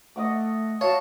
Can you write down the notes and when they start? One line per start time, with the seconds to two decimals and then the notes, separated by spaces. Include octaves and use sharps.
0.16 A3 D#5 F#5 D6
0.81 F#4 C#5 F5 A5